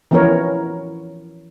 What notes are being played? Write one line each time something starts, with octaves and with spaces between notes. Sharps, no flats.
E3 F3 B3 C#4 A#4 C#5